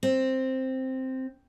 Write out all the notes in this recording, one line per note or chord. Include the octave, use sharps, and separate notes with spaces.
C4